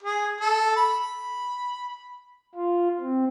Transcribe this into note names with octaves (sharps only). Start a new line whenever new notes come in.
G#4
A4
B5
F4
C4